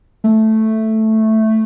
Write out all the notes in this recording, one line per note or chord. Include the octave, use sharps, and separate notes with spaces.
A3